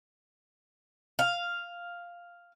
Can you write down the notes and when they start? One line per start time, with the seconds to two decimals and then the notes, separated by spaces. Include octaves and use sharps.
1.19 F5